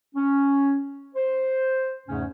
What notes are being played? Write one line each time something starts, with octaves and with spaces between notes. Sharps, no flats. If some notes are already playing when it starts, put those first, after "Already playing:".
C#4
C5
E2 G#2 C#3 A3 C#4